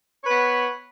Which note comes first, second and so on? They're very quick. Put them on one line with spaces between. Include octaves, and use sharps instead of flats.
C#5 B4 B3